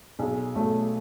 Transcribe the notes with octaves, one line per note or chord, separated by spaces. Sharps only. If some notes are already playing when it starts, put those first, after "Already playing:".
B1 G#4
B1 A3